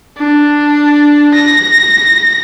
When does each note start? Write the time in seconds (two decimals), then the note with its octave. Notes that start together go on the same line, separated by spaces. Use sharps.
0.18 D4
1.34 A#6